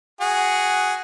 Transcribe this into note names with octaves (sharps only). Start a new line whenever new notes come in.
F#4 G#4